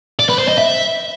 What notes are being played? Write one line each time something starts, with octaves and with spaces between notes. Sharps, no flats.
D5
B4
C5
D#5
E5